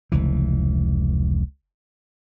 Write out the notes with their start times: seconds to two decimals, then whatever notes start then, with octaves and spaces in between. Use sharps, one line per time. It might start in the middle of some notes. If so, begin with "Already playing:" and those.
0.12 F1 C#2 E3